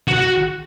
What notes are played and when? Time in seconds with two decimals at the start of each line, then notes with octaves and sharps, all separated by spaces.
0.08 F#4
0.13 F#5
0.18 F#4